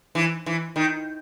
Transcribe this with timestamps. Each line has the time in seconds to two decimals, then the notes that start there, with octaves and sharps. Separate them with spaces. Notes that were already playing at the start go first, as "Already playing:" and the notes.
0.15 E3
0.46 E3
0.76 D#3